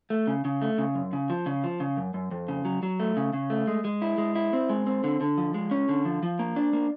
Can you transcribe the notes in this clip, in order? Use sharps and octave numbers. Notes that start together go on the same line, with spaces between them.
A3
C#3
C#3
A3
C#3
F#2
C#3
F3
C#3
F3
C#3
F#2
F#2
F2
C#3
F#3
F#3
A3
C#3
C#3
A3
G#3
G#3
E4
G#3
E4
C4
G#3
C4
D3
D3
F3
G#3
C#4
D3
F3
F3
A#3
D4
A#3